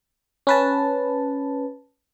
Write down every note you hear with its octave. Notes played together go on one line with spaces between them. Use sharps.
C#4 B4 A5